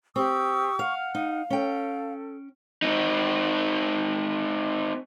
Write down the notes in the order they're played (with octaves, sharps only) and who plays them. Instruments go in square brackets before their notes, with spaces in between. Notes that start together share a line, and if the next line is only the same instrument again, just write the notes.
[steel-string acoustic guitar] C4 [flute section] G4 D#6 E6 [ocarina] C#6
[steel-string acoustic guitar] F5 [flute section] F#5 F6
[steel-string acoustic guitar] D#4 [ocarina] F5
[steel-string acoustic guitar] C#4 G5 [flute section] A4
[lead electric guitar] C4 D#4